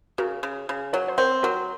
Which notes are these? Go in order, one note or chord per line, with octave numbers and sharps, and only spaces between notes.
C#3 F#4 A#4
C#3
C#3
F#3 A#4 C#5
C5
C4 A#4 C#5
F#3 F#4 A#4